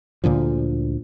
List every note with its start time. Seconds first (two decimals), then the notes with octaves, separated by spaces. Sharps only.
0.24 D2 A#2 D3 F3